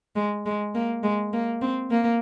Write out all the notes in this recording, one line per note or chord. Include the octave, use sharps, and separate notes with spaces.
G#3
G#3
A#3
G#3
A#3
C4
A#3